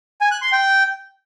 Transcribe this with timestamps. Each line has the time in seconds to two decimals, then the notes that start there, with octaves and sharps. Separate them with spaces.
0.21 G#5
0.31 F#6
0.42 C6
0.52 G5